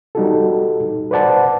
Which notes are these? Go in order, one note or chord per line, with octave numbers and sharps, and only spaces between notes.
G3 D#4 F#4 A4
B4 C5 D5 F#5 A5